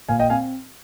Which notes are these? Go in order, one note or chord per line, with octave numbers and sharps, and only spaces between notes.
A#2 F5 G#5
D#5 G5
C4 F5 G#5